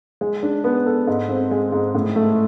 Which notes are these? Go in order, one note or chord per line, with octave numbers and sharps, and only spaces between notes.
G#3
D4
B3
A4
G#2
C4
G#3
G#2
A2
A3